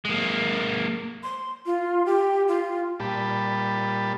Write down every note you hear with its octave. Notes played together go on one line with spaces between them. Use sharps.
G#3 A#3
C6
F4
G4
F4
A#2 G3 G4 A5 B5